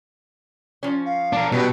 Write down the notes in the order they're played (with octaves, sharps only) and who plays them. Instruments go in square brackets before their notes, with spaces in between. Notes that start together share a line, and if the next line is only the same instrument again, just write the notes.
[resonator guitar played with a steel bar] F3 C#4
[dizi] F5
[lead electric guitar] D4 A#4
[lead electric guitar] B2 [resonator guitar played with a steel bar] F#3 G3 D4 [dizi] B4